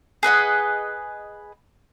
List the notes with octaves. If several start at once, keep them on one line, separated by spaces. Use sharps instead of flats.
G#4 B4 D#5 F#5